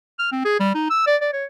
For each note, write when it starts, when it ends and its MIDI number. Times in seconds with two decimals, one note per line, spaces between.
0.19 0.27 89
0.32 0.41 60
0.45 0.59 68
0.60 0.70 55
0.74 0.89 63
0.90 1.05 88
1.07 1.16 74
1.21 1.30 74
1.33 1.45 73